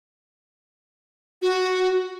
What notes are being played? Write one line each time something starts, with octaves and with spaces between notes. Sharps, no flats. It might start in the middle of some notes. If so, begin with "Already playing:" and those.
F#4